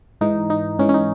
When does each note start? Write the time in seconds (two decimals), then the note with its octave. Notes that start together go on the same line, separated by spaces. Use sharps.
0.21 G#2 E3 D#4
0.50 D#4
0.79 G#2 E3 C#4
0.89 C#4
0.94 D#4